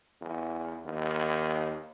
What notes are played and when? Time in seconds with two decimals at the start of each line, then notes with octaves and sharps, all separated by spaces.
0.21 E2
0.85 D#2